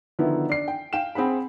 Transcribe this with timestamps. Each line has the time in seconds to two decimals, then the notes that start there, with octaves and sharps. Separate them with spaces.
0.19 D3 D#3 F3 B3 E4
0.49 D4 C7
0.68 G5
0.93 F5 G5 E7
1.15 C4 G#4 F#5 B5